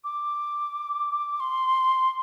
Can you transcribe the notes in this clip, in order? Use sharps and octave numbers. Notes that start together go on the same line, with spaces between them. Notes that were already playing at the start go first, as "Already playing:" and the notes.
D6
C6